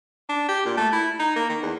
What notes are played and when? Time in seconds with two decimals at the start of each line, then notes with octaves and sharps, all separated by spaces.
0.29 D4
0.49 G4
0.66 A#2
0.77 A3
0.93 E4
1.20 D#4
1.36 A#3
1.49 D#3
1.63 E2